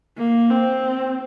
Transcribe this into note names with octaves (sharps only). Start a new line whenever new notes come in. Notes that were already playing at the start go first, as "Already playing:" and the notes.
A#3
C4